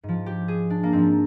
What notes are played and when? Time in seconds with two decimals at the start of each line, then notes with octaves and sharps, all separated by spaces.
0.03 G#2
0.08 F3
0.26 G4
0.48 G#4
0.70 D4
0.83 A#3
0.93 G#2 F3 C4